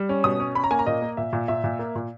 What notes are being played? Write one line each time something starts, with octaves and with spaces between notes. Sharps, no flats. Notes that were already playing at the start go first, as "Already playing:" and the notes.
Already playing: G3
C#4
B2 D#6
C#4
C#4 B5
A#5
A#3 G#5
A#5
A#2 D#5
A#3
A#2 E5
A#2
A#2 E5
A#2
A#3
A#2